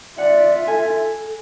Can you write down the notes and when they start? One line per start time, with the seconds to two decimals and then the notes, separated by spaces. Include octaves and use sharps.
0.18 F4 D5 E5 F#5
0.67 A4 G#5